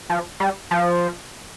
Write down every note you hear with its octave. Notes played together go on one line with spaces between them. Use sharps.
F3
G3
F3